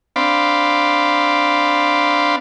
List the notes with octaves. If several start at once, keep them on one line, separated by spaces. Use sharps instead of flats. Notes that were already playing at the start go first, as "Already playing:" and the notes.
C4 D4 F5 B5 C6 D6